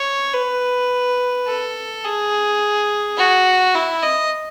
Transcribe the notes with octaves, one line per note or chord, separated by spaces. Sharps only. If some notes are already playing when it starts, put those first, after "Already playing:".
Already playing: C#5
B4
A4
G#4
F#4
E4
D#5